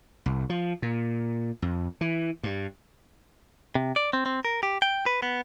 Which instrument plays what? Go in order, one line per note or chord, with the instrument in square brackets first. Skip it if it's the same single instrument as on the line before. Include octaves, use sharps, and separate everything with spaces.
[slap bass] C2
F3
A#2
F2
E3
G2
[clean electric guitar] C3
D5
C4
C4
A#4
G4
G5
B4
B3